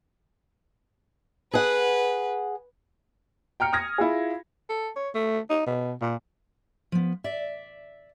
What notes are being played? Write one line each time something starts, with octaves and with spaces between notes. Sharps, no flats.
G#4 B4 F#5
G5 A#5 F6 C#7
D#6 F6 G#6 A#6
E4 F4 G#4
A4
C#5
A3
D#4
B2
A#2
F3 B3
D5 E5